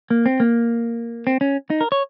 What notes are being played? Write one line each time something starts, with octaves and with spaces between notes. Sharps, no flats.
A#3
C4
A#3
C4
C#4
D#4
A#4
C#5